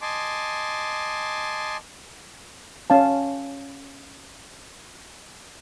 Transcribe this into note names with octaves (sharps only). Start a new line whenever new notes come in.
D#5 G#5 A5 C6 D6
C#4 F5 A5